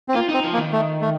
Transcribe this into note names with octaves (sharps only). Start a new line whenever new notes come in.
C4
A#3 F4
C4 D#4
F3
A#3
D#3
A3
A3